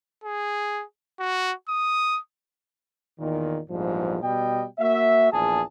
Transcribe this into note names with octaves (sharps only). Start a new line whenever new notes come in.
G#4
F#4
D#6
E2 A#2 D#3
A#1 E2 G#2 F3 G3
B2 G3 D#5 G5
A#3 F#4 E5
A#1 E2 G#4 A5